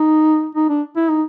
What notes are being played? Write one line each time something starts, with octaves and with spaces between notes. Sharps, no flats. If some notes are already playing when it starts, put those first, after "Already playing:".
Already playing: D#4
D#4
D4
E4
D#4